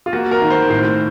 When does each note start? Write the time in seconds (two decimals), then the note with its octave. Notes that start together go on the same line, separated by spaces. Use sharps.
0.06 F4
0.13 A#3 F#4
0.31 A#4
0.42 D#3
0.50 C5
0.69 A2 C5